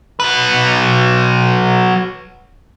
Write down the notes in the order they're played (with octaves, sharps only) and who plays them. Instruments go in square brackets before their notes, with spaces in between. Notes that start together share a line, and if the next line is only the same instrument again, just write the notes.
[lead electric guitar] F#3 B4